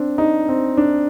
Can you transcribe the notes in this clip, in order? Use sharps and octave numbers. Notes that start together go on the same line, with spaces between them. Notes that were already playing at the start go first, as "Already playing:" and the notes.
Already playing: C4 D4
D#4
C4
D4